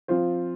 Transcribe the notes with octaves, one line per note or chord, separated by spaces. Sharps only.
F3 C4 F4 C5